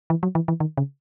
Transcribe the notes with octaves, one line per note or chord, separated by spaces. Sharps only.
E3
F#3
E3
E3
D#3
C#3